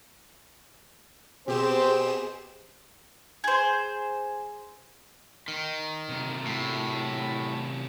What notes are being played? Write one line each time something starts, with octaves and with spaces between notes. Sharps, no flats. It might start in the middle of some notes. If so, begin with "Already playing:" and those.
B2 C4 G4 G#4 C5 E7
G#4 C5
D#3
C3 A#3
A2